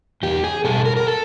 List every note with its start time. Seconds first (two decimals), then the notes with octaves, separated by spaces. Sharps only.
0.23 E2 G4
0.44 G#4
0.64 B2 G3 A4
0.85 A#4
0.97 A#4
1.07 A4